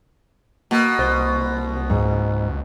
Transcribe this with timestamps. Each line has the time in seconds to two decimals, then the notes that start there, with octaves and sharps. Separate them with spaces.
0.71 B2 A#3
0.99 C2 C5
1.90 C#2 G#2